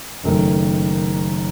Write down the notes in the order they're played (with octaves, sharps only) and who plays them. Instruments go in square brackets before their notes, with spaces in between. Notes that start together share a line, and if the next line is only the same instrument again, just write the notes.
[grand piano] F#1 F#2 D#3 A3